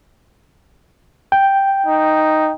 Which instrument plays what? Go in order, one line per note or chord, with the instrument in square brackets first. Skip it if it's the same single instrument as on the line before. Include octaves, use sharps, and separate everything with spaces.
[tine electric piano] G5
[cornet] D#4